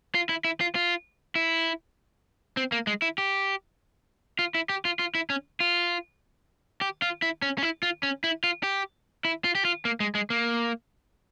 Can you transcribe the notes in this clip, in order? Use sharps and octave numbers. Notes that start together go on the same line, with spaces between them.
F4
E4
E4
F4
F4
E4
C4
A#3
G#3
E4
G4
F4
E4
G4
F4
F4
E4
C#4
F4
G4
F4
E4
C#4
C#4
E4
F4
C#4
E4
F4
G4
E4
F4
G4
F4
A#3
G#3
G#3
A#3